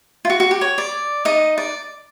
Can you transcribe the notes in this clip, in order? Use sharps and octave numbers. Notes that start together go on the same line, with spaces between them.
F4
F#4
F#4
G4
C#5
D5
D#4 D#5
D5